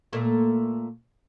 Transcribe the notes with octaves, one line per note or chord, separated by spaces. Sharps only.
A#2 A3 A#3